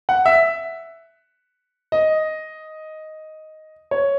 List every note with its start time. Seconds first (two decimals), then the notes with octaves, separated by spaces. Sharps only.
0.09 F#5
0.26 E5
1.92 D#5
3.91 C#5